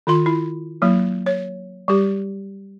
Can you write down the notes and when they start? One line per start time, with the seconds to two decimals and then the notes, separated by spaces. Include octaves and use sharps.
0.07 D#3 F4 C6
0.26 E4
0.82 F#3 A#3 E4
1.26 C#5
1.88 G3 G4